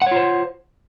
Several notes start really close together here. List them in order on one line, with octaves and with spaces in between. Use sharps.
F#5 C#5 F4 C5